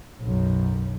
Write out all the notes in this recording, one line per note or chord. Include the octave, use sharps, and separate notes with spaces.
B1 F#2